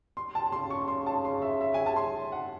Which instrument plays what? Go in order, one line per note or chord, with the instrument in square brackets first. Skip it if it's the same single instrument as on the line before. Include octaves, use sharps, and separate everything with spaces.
[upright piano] C6
A5
[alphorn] C#3 [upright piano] C6
[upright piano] C#6
C6
A5
C6
E5
E5
G#5
A5
C6
F#5